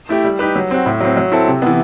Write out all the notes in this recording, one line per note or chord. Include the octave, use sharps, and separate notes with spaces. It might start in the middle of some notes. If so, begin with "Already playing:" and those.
A3 E4 G4
G3
D#4 G4 B4
F#3
C4 F#4
A2
F#3 C4
F#3
C4 E4 A4
C3
E3 B3